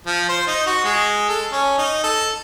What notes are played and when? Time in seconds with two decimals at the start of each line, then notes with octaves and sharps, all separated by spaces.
0.07 F3
0.29 C5
0.47 D#4
0.67 F#4
0.85 G#3
1.29 A4
1.52 C#4
1.78 D#4
2.04 A4